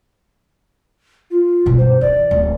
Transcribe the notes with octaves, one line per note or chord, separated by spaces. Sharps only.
F4
G2 B2
C5
E3 D5
D1